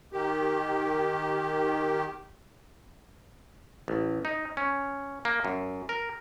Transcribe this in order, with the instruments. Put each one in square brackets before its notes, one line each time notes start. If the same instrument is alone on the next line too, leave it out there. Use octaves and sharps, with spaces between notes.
[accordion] D#3 G4
[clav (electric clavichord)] A1
D#4
C#4
A#3
F#2
A#4